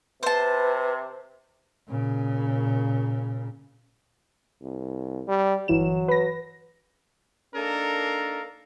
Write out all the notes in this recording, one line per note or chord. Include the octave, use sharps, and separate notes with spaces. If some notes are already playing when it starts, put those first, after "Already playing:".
C3 B4 C5 A5
A#2 C#3
C2
G3
G1 E3 F#3 E7
B4 A#6
A#3 D4 D#4 A4 A#4